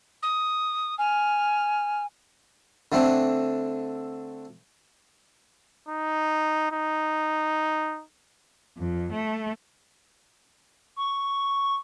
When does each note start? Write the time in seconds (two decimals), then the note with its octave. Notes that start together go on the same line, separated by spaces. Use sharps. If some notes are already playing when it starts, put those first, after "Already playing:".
0.22 D#6
0.98 G#5 F6
2.92 D3 A3 C4 D4
5.89 D#4
6.72 D#4
8.78 F2
9.12 A3
10.96 C#6